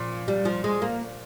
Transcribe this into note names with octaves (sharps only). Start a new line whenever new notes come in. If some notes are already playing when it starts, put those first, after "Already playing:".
Already playing: A#2 F3
G3
F3
G#3
A#3